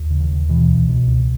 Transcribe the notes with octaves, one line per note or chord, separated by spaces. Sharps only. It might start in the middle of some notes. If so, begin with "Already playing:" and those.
Already playing: D#2
C#3
D#3
D#2
B2 E3
C#2
B2
C#2